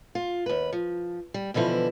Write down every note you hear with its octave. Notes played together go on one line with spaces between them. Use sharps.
F4
D#2 B4
F3
G3
B2 D3 E3 F3 E4